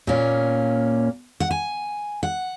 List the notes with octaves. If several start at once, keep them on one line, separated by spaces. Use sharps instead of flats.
A#2 A#3 C#4
F#5
G#5
F#5